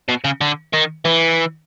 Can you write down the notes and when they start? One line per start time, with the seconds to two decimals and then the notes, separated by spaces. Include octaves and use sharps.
0.08 B2
0.24 C#3
0.41 D3
0.74 D#3
1.05 E3